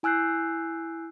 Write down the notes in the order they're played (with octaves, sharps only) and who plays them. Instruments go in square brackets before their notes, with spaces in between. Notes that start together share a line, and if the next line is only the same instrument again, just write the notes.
[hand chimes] E4 G#5 E6 F#6 G6 C7